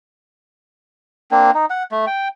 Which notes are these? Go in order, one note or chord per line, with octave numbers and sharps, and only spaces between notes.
A#3 C4 D4
D#4
F#5
A3
G5